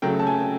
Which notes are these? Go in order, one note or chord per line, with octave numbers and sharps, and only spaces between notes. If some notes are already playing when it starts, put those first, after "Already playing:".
C#3 F#3 A3 G5
A5
G#5